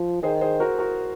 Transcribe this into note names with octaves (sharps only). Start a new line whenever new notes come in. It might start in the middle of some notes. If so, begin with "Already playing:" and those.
Already playing: F3
D#3 G#4 C5
G#4 C5
F#4 A#4
F#4 A#4